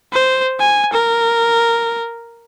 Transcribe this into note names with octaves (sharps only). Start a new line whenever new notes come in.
C5
G#5
A#4